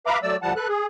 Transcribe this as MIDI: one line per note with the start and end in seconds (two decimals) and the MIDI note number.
0.06 0.18 71
0.06 0.18 76
0.06 0.18 77
0.06 0.18 82
0.06 0.18 83
0.06 0.18 86
0.23 0.36 54
0.23 0.36 57
0.23 0.36 74
0.23 0.36 88
0.42 0.53 38
0.42 0.53 46
0.42 0.53 53
0.42 0.53 55
0.42 0.53 78
0.42 0.53 81
0.56 0.68 69
0.56 0.68 71
0.56 0.68 90
0.69 0.86 68